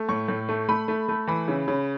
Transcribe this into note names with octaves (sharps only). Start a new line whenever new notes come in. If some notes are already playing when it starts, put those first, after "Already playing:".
Already playing: A3
A2 C#6
A2
A3
A3 B5
A3
A3
E3 B5
C#3
C#3